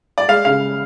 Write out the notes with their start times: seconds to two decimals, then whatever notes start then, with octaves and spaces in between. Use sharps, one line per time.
0.18 D5
0.28 G#3 F5
0.45 C#3 F5